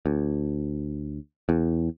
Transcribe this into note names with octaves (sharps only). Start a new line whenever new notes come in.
D2
E2